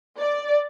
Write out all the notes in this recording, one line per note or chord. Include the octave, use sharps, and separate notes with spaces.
D5